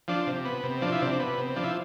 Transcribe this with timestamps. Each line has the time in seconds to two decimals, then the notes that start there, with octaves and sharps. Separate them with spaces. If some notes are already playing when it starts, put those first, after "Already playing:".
0.08 F3 D4
0.27 C3
0.45 B3
0.63 C3
0.82 F3 D4
0.92 E4
1.01 C3 D4
1.20 B3
1.37 C3
1.56 F3 D4
1.64 E4